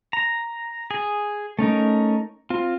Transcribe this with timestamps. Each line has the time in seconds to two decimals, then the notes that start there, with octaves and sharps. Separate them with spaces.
0.13 A#5
0.91 G#4
1.59 A3 C#4 D#4 A#4
2.50 C4 F4